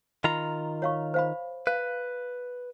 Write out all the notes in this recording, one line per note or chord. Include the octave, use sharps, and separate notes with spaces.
D#3 F4 A#5 B5
C#5 F5 C#6
C5 F5 B5
B4 F5